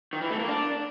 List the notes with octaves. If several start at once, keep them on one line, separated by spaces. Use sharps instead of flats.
D#3
E3
A3
A#3
D4